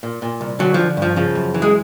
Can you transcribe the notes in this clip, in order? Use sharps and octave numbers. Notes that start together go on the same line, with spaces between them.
A#2
A#2
C2
D3 F#3
D3 F3
G2 F3
C#3 F3
F#2
E3
G#3